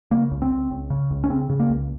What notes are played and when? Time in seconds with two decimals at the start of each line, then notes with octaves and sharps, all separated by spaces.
0.11 C#3 A#3
0.31 C#2
0.42 C4
0.51 C#2
0.71 C#2
0.90 C#3
1.10 C#2
1.24 C#4
1.30 C#3 C4
1.50 C#3
1.60 A#3
1.70 C#2